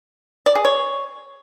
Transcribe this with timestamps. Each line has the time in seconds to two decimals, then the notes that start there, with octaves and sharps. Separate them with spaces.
0.46 D5
0.55 G#4
0.65 C#5